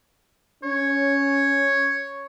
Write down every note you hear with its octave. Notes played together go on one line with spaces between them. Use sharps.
C#4 C#5